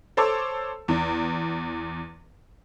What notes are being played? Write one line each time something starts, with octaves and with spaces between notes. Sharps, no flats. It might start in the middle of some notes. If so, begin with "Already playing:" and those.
A4 C5 C#5 A5 D6 E6
E2